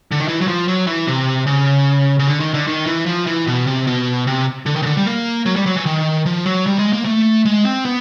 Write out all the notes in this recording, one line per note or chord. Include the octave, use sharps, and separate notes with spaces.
D3
D#3
E3
F#3
F3
F#3
E3
C3
C#3
C#3
D3
D#3
D3
D#3
E3
F3
E3
B2
C3
B2
C3
D3
D#3
C#3
D3
G3
A#3
F#3
G3
F#3
E3
D#3
F3
F#3
G3
G#3
A#3
A3
G#3
C4
B3